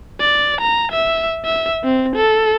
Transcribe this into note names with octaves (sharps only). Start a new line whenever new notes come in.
D5
A#5
E5
E5
C4
A4